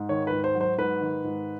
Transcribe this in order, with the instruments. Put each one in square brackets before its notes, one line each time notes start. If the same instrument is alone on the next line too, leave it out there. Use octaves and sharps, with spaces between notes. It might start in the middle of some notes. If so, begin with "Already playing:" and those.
Already playing: [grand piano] G#2
D#3 C#5
B4
G#2
C5
F#3
C5
G#2 B4
D#3
G#2